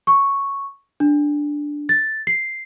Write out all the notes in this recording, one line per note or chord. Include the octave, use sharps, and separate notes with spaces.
C#6
D4
A6
C7